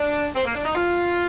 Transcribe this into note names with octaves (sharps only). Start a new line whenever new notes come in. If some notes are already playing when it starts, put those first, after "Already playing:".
Already playing: D4
C4
A#3
D4
D#4
F4